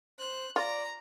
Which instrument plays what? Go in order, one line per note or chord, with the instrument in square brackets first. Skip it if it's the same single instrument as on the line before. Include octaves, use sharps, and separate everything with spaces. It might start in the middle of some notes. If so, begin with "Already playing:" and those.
[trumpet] C5 [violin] F#6
[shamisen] F4 [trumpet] D5 [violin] A#5 A#6